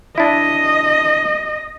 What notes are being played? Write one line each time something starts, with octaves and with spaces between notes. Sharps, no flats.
D4 E4 D#5